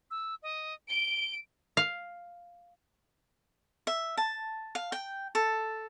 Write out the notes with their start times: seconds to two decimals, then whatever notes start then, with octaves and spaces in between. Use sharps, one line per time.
0.11 E6
0.43 D#5
0.89 D7 G7
1.77 F5
3.87 E5
4.17 A5
4.75 F5
4.92 G5
5.35 A4